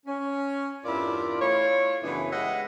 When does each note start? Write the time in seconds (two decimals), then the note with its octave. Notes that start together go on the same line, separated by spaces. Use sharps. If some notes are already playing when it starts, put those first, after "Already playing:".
0.06 C#4
0.85 E2 G2 E4 F4 A#4 D5
1.40 A3 E4 F4 C#5
2.02 F#2 C#3 E3 B3 D4 E4
2.31 G#3 G4 D#5 E5 F#5